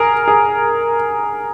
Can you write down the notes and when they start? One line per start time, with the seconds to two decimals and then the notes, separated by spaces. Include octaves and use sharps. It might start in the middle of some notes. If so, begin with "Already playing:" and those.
Already playing: G#4 A#4
0.28 G#4